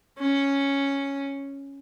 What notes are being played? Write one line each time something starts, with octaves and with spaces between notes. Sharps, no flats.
C#4